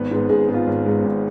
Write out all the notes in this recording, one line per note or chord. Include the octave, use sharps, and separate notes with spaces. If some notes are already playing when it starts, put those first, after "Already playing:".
Already playing: G#1 B3 B4
G#2 G#3 B3
G#1 G#3 G#4
G#2 G#3 B3
F4
G#1
G#2 G#3 B3
G#1